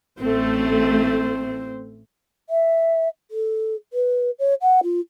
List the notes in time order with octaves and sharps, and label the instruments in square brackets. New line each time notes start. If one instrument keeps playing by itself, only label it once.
[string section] A1 A3 [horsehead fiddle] C4 C5
[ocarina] E5
A4
B4
C#5
F#5
F4